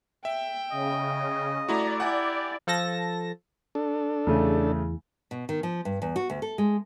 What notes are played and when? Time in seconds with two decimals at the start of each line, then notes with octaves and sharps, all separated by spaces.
0.25 E5 G5
0.72 C#3 D#5
1.68 A3 E4 F#4 D5 A#5
2.00 E4 G4 F#5 G#5 D6
2.67 F3 A4 A5 A#6
3.75 D4 A4
4.27 E2 C#3 A3
5.31 B2
5.49 D#3
5.63 F3
5.85 G2
6.02 E2
6.16 F#4
6.30 D2
6.42 A4
6.58 G#3